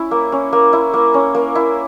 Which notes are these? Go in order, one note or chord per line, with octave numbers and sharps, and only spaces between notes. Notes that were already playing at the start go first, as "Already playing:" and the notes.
Already playing: C#4 E4
A#3
C#4
A#3
E4
A#3
C#4
A#3
E4